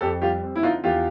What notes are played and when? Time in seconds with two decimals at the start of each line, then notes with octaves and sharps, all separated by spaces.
0.01 F2 G4 A4
0.22 G3 F4 G4
0.43 C4
0.56 E4
0.63 D3 D#4 F4
0.84 E2 F4 G4